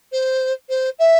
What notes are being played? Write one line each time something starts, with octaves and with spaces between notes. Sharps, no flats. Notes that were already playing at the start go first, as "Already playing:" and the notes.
C5
C5
E5